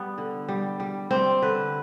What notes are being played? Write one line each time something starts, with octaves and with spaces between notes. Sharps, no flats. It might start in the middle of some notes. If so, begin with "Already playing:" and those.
Already playing: G3 B3
D3
G3
G3
G3 C4
D3 B4